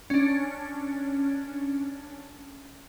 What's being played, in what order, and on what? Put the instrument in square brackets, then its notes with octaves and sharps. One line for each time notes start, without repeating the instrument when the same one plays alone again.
[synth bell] C#4 D4